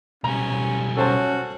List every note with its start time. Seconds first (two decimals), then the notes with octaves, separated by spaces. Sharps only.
0.24 B1 G3 C#4 A#5
0.97 C#4 F#4 A4 C5 A5